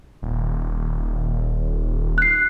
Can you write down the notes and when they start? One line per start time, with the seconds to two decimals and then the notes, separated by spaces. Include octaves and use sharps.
0.22 D#1
2.18 F#6 C7